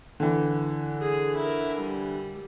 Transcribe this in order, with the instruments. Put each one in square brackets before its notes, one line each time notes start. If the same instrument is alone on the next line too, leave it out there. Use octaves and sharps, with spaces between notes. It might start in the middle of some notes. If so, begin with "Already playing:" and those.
[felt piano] D3 E3
[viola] G#4
E4 A#4
G3